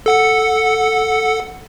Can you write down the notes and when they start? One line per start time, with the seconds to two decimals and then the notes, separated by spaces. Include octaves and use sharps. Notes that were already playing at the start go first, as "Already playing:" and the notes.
0.06 A4 F#5 C#7